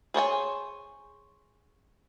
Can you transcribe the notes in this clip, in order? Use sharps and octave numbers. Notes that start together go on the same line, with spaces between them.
G#4 C5 C#5 G#5